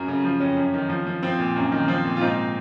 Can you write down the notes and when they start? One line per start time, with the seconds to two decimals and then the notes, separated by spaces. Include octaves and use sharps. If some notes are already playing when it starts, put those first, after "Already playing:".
Already playing: F#2 F#4 A#4
0.08 C#3
0.24 F3
0.40 F2 C#4
0.57 F#2
0.74 D#3
0.89 F3
1.07 F3
1.23 F3 C4
1.39 A#2
1.56 F#2
1.72 D#3
1.88 F3 C4
2.05 A#2
2.16 F4
2.20 G#2 C4 D#4